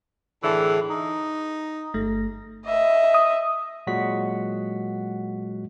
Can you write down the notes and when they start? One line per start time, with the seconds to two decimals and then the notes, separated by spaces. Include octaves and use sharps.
0.44 A2 D3 E3 G#4
0.90 D#4
1.94 G1 A3 A#6
2.66 D#5 E5
3.14 D#6
3.87 A#2 F#3 G#3 F#4 F#5 B6